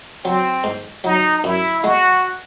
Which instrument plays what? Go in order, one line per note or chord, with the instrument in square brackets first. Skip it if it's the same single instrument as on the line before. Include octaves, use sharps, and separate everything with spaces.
[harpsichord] F#3 [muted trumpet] C4
[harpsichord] G#2
[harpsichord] F#3 [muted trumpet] D#4
[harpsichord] F#2 [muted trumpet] E4
[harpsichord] G#3 [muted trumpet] F#4